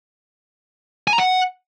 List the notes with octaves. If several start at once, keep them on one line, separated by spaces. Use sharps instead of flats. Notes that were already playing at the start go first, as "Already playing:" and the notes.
G#5
A#5
F#5